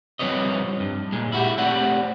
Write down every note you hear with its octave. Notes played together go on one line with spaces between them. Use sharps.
F3 G3 C4 B4 C#5 D#5
G2
A#2 G#3
E4 F#4 G4
A3 C4 G4 D5 F#5